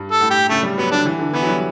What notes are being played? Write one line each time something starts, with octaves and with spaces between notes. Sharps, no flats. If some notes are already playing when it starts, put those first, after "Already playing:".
Already playing: G2
A4
A2
G4
C#3 A3
G3
F#3 B3
D3 D4
E3
D3
E3 B3
F#3
G3